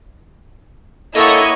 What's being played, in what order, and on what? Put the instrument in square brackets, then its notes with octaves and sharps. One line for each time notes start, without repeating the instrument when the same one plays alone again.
[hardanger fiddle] A#3 F#5 [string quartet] E4 C#6 [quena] A4 [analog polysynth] C#5 D#5